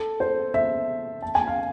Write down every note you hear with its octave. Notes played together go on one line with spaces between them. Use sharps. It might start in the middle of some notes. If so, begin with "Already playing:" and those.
Already playing: A4
C5
E5
A5
G#5
F5